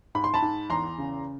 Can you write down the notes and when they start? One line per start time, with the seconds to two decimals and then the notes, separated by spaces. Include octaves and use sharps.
0.15 G#2 B5
0.24 C6
0.34 A5 B5
0.42 G#2
0.70 E2 A#5 C6
0.98 C#3